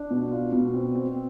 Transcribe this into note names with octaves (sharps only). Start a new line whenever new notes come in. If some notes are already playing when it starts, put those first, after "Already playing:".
Already playing: D4
B2
F4
B2
C4
C4